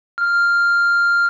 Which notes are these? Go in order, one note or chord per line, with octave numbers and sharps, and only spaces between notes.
F6